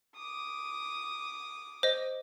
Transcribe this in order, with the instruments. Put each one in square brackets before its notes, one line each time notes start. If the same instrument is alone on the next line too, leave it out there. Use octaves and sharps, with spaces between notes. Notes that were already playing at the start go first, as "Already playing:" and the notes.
[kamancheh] D6 D#6
[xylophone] C5 D#5